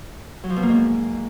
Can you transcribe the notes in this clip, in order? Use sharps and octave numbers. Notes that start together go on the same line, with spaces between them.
F#3
F3
B2
A#3
G#2